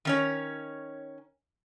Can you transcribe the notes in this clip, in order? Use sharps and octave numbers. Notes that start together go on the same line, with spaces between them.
D#3 C#4 C#5